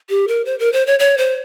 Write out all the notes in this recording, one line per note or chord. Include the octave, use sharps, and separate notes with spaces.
G4
A#4
C5
A#4
C5
C#5
C#5
C5